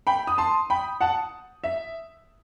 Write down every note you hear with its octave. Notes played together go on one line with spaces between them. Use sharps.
G5 B5
D#6
A5 C6
G5 B5
F#5 A5
E5